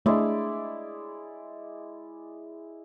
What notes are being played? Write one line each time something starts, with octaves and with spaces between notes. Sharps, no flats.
G#3 A3 D4 E4 D5